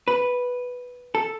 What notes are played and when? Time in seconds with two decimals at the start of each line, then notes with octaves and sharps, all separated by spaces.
0.08 B4
1.15 A4